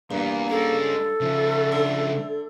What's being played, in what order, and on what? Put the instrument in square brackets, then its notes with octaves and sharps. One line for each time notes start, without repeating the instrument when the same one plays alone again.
[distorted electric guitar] E2 [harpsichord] G2 [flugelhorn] A#3
[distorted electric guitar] G#3 C#4 [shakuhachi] A4
[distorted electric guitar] C#3 F3 [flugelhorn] E5
[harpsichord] D3